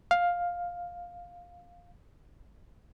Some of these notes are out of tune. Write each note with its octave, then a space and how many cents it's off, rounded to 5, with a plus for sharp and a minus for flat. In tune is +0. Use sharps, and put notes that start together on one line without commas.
F5 +10